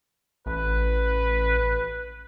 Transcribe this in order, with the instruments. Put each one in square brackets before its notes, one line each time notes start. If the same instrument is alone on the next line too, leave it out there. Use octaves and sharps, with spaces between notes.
[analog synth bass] A1 [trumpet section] B4